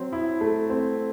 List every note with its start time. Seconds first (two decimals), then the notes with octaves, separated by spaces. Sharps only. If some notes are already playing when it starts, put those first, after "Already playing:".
Already playing: F#3 C4
0.12 E4
0.41 A3
0.70 C4